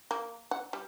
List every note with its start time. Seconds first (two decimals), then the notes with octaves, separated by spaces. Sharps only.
0.11 A#3
0.51 F#5
0.73 G3